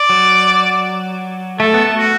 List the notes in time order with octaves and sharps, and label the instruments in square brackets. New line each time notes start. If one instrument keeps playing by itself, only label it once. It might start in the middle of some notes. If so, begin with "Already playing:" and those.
Already playing: [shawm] D5
[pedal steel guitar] F#3
[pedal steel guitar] A3 [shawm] A4
[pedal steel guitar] B3
A3
[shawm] F#4